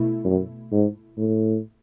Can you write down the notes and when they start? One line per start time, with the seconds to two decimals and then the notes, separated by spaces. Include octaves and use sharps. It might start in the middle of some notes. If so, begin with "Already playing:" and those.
Already playing: B2 A3 E4
0.25 F#2
0.71 G#2
1.17 A2